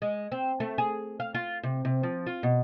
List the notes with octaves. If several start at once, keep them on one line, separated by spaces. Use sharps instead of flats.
G#3
C4
A3
G#4
F5
F4
C3
C3
F3
F4
B2